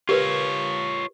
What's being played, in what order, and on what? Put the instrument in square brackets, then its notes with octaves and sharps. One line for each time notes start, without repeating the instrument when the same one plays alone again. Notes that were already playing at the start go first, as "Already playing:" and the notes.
[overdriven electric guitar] F4 C#5 [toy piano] G4 A#4 B4